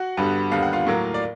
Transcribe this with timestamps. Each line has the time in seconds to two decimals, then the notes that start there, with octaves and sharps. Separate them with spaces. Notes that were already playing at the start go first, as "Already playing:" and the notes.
Already playing: F#4 F#5
0.17 G2 D3 G3 B3
0.52 D#2 D3 G3 B3 F5
0.63 F#5
0.73 F4 F5
0.87 A2 F#3 A#3
1.14 D5